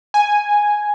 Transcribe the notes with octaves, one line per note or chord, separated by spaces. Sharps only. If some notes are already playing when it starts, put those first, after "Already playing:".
G#5